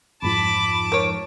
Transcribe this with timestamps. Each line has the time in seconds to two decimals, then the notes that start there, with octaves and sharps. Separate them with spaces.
0.22 F2 G#2 F3 A5 B5 D6
0.92 A#4 C#5 D7